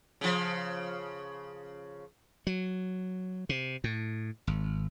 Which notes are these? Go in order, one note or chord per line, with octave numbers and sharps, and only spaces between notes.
C#3 F3
F#3
C3
A2
G#1